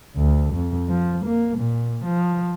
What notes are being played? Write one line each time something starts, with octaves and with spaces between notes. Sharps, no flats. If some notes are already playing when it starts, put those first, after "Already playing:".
D2
F2
F3
A#3
A#2
F3